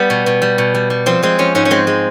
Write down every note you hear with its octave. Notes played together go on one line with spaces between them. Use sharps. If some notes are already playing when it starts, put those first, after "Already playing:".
Already playing: G3 B3
B2
B2
G3
B2
G3
G3
F3 C4
G#3 C4
F3 C#4
G#2 C#4
C#4
G#3 C4
G#3